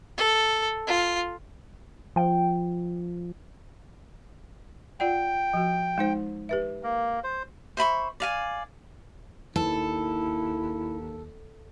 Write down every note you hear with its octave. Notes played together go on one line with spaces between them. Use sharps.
A4
F4
F3 G5
F4 D5 F#5 G5
F3 F#4
G#3 D#4 C5
G4 B4 E5
A#3
C5
C5 E5 B5 C#6
D5 F5 G#5
D#2 E4 A4